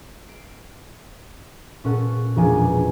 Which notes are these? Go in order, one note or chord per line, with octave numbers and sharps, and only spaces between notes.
C7 D7
A#2 C#4 A4 F#5
E1 F3 A#3 D4 G#5